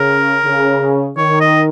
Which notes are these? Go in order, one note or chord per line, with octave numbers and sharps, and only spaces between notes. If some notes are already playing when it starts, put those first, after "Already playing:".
Already playing: C#3 A#4
C#3
D#3 C#5
D#5